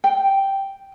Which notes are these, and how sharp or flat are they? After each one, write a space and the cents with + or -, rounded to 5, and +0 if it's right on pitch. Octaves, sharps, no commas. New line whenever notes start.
G5 -5